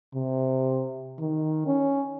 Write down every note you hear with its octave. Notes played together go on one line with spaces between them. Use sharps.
C3
D#3
C#4